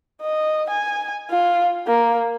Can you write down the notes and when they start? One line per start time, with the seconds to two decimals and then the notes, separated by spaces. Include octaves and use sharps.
0.21 D#5
0.69 G#5
1.30 F4
1.87 A#3